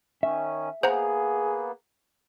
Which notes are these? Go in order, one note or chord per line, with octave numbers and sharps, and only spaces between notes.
D#3 C#4 E5
A#3 B3 G#4 C5 F#5 A#5